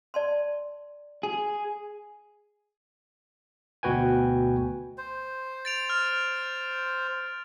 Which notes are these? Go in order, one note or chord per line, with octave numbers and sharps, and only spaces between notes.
D5 A5 C6
G#4
D2 B2 F#4 B4 G5 G#5
C5
A6 D7 F7
F6